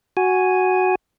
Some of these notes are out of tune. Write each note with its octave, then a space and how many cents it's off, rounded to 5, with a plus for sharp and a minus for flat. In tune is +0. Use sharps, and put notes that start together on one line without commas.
F#4 +0 G#5 +0